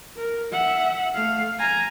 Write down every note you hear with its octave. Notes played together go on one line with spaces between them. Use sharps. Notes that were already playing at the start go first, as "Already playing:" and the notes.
A#4
E5 F#5
A3 F5
G#5 A#5